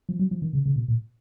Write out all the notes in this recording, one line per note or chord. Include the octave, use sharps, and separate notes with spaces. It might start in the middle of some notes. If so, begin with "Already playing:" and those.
F3
F#3
F3
D#3
C#3
C#3
B2
A#2